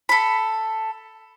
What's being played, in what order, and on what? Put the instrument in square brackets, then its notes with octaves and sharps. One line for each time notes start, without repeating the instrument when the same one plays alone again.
[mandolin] A4 B5